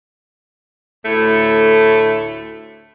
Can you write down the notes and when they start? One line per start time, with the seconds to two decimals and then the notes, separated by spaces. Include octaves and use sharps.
1.05 D2 A2 A3